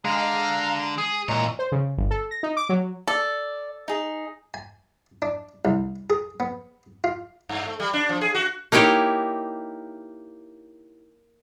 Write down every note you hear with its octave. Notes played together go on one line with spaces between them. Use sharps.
D3 G#3 F5 A#5
G#4 D#6
A#2 E3 G#3 C#5 A#5
C5
C#3
G1
A4
A#6
D#4
D6
F#3
A4 D5
D#4 G#4
G#5
D4
C2
G#4
B3
F4
G2
A3
G3
D4
F3
G#4
F#4
A#3 D#4 E4 G4 C#5